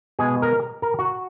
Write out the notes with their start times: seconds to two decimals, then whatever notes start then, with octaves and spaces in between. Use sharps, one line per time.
0.19 B2 G#3 G#4
0.42 A#4
0.82 A#4
0.99 F#4